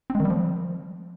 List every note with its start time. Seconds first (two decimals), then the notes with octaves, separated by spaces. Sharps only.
0.10 C4
0.15 G#3
0.20 D#3
0.25 G3
0.30 F3